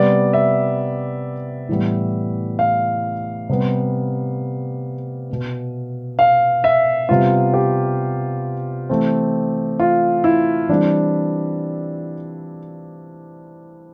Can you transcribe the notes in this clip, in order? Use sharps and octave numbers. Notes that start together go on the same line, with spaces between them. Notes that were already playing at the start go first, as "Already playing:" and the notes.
Already playing: C3 G3 B3 D5
E5
A2 E3 G3 B3
F5
C3 G3 B3
B2 B3
F5
E5
C3 G3 B3 F4
G4
E3 A3 C4
F4
E4
E3 G3 C4 D4